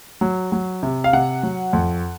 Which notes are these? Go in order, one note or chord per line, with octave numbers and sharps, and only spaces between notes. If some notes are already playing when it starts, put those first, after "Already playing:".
F#3
F#3
C3
F5
C3 F#5
F#3
F2